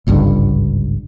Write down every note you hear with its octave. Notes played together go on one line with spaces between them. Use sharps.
G#1 C#2 G2 D3